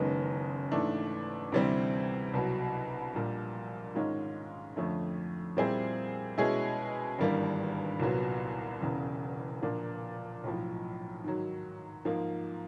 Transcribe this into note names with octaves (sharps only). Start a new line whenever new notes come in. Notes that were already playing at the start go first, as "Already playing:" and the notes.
Already playing: F#1 F#2 D#3 G#3 B3
G#2 E3 A3 D4
D2 C3 E3 G3 C4
C2 B2 F#3
A#1 A#2 G3
G#2 D#3 G#3 C#4 F4
F2 D3 F3 A3 C#4
A#2 G3 C4 E4 G#4
B2 G#3 C#4 E4 G#4
G#1 G2 E3 G3 A#3
C2 A#2 F#3 B3
E1 E2 C#3
A#2 F3 A#3 D4
B1 A2 F3
G#2 D#3 F#3
G#2 F3 A#3